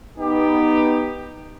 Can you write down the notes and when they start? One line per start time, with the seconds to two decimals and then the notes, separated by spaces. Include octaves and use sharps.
0.19 B3 D#4 G4